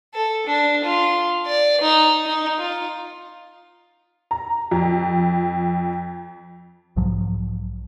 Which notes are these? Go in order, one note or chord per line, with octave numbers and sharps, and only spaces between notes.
A4
D4
F4
D5
D#4
D#4
F4
A#5
F2
B1 G#2 F3 F#3